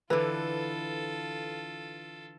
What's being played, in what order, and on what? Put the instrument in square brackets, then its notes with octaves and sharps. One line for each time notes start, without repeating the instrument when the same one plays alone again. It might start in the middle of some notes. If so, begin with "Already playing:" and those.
[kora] D3 E3 [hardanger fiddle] F4 A4 [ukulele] B4